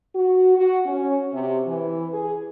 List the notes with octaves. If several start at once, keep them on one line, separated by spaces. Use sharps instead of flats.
F#4
F#4
C#4
C3
E3
G#4